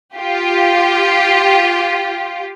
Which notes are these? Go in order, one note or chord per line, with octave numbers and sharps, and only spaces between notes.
F4 G4